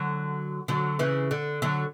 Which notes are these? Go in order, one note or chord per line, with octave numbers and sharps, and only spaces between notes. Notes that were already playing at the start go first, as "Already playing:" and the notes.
Already playing: D3 F#3
D3 F#3
C#3 E3
D3
D3 F#3